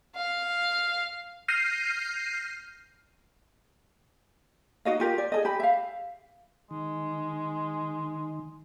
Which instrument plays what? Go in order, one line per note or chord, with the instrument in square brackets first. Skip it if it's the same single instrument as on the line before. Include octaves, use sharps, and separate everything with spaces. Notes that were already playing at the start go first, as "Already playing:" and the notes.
[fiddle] F5
[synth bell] F6 G6 A#6 C7 D#7
[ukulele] D#4 F#4 D#5 F5
F4 G4 A#4
D5
G#4 A4 D#5
G4 B5
E5 F5
[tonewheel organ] D#3 [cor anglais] G#3